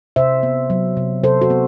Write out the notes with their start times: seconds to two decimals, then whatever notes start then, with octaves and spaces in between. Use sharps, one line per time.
0.16 C3 C5 E5
0.43 B3
0.70 F#3
0.97 C3
1.24 C3 A4 C5
1.41 F#4 A4
1.50 B3